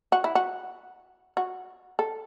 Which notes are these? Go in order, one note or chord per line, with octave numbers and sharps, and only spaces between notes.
F#4
E4
F#4
F#4
A4